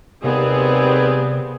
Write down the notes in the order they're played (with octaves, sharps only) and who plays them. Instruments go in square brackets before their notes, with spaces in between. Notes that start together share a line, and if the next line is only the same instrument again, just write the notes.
[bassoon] D#2 [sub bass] C3 [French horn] G3 [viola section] B3 C4 G#4